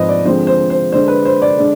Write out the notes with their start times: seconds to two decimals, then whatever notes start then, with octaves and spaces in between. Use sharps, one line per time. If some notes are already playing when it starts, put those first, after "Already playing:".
Already playing: G#2 F3 C4 B4 C5 D#5
0.08 D5
0.25 D3 F3 G#3 C4 C5
0.47 C5
0.70 C5
0.92 D3 G#3 D4 C5
1.08 B4
1.25 C5
1.42 D5
1.58 D3 G#3 D4